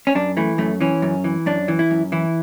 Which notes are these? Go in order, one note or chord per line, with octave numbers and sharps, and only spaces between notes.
C#4
F#2 D4
E3 A3
F#2 A3
E3 C#4
F#2
E3
F#2 D4
E3
E4
F#2
E3 E4